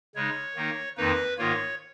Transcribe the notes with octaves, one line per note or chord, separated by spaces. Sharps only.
C#3 G#3 D#4 C#5
D#3 A#3 D#4
F2 D#3 A#3 D#4 B4
G#2 D#3 A#3 F4 C#5